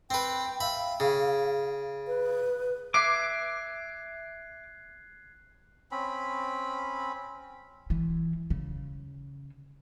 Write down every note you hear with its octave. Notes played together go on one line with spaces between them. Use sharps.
C4 B4 G5
E5 F5 B5
C#3
B4
E5 D6 F#6 G#6 C7
C4 C#4 B5
E3
C#3